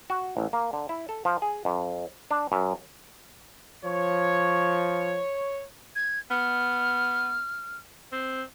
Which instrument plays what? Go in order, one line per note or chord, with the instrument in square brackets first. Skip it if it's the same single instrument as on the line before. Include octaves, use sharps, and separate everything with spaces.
[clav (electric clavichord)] F#4
A1
A#3
D3
E4
A4
F3
G#4
F2
D4
F#2
[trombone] F3 [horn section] C#5
[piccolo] G#6
[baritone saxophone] B3 [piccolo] F6
[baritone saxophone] C4